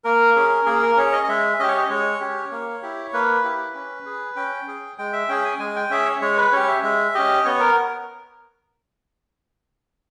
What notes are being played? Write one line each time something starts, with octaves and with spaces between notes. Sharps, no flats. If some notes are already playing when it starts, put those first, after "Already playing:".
A#3 A#4
C#4 G#4
A#3 G#4
A#4
C#4 G#4 C#5
D#5
D#5
G#3 E5
C#4 G4 D#5
C#5
D#5
G#3 C#5
C#4 G4
A#3
E4 G4
A#3 B4
E4 G4
C#4
G#4
C#4 G5
G#4
G#3 G5
E5
C#4 G#4 G5
G#5
G#3 G#5
G5
C#4 G#4 E5
C#5
G#3 C#5
B4
C#4 G4 C#5
E5
G#3 E5
C#4 G4 D#5
B3 C#5
A#4